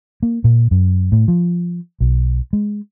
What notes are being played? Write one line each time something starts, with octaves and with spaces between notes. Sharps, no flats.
A#3
A#2
F#2
A2
F3
B1
G#3